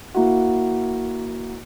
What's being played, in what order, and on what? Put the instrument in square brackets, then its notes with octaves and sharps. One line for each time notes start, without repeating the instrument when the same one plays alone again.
[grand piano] A#3 E4 F#4